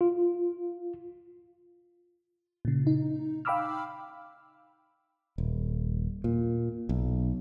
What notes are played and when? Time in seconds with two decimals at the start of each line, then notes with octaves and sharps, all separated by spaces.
0.01 F4
2.65 A#2 C#3
2.87 D#4
3.45 F5 G5 B5 D6 E6 F6
5.38 D#1
6.24 A#2
6.89 B1